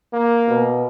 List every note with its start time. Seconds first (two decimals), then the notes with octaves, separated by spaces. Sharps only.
0.13 A#3
0.49 B2